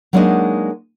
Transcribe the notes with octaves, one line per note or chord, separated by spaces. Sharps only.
F#3 G#3 A#3 D4 D#4 D#5